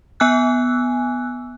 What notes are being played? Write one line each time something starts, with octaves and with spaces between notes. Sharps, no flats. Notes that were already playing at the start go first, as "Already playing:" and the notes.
B3 G#5 E6 F#6